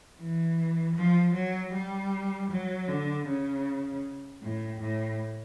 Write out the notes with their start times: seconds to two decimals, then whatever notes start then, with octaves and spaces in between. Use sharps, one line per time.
0.20 E3
0.96 F3
1.35 F#3
1.74 G3
2.50 F#3
2.88 D3
3.27 C#3
4.42 A2
4.80 A2